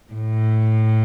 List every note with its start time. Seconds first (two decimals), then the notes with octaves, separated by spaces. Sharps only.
0.13 A2